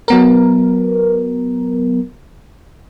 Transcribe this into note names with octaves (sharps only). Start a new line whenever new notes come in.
F#3 B3 A#4